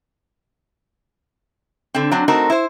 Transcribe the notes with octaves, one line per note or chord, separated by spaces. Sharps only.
D3 C4
F#3 C4 D4
A3 C4 D#4 F#4 A#4
E4 C5